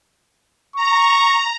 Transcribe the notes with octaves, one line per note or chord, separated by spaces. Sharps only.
A#5 C#6